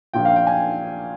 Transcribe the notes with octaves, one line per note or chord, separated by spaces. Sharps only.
A#1 A#2 F3 G5
F5
G5
G#5